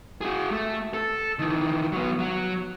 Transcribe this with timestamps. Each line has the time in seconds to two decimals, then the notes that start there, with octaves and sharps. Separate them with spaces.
0.21 F#4 G#4
0.51 A3
0.94 A4
1.39 D#3 E3
1.92 F#3 B3
2.19 F#3